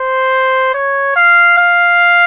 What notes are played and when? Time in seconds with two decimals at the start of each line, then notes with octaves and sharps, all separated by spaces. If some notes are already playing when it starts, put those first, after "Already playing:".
Already playing: C5
0.74 C#5
1.16 F5
1.57 F5